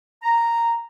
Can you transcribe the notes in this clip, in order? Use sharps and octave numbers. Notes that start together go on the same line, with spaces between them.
A#5